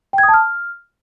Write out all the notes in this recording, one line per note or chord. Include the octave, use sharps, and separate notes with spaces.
G5
G#6
D#6
A5
F6